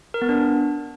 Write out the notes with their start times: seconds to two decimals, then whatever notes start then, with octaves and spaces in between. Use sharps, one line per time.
0.14 A#4
0.22 B3
0.29 D4